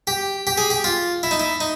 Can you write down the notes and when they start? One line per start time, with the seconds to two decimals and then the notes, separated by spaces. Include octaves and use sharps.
0.07 G4
0.47 G4
0.58 G#4
0.70 G4
0.84 F4
1.23 E4
1.31 D#4
1.40 E4
1.60 D#4